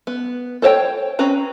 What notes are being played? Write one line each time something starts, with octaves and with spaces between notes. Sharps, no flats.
B3
A4 C5 C#5 F5 G5
C4 C#4 B4 A#5